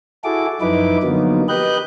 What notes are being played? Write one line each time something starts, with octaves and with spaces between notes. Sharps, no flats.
E4 F#4 G#4 A4 D6
F#2 F3 D#4 E4 B4 D6
D3 F3 F#3 A#3 B3 D#4
G4 B4 D#5 F#6 G6